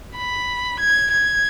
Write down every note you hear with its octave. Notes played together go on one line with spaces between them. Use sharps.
B5
G#6
G#6